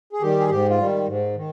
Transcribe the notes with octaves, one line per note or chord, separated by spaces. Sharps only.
G#4
D#3 G3 G4
G#4
G#2 G4
F4
D#3 G3
G#2
D#3